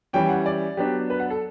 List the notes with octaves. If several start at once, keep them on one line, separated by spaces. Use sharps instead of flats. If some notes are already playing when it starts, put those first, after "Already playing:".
E3 G3 C#4 G5
F#5
D5
F#3 B3 D4 G4
B4
F#5
A4